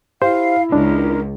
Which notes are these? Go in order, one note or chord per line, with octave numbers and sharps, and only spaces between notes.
E4 G4 C5 F5
C#2 D4 A#4